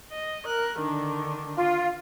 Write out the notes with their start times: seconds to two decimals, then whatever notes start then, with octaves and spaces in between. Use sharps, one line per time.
0.11 D#5
0.45 A#4 F#6
0.78 D3 D#3 D4
1.56 F4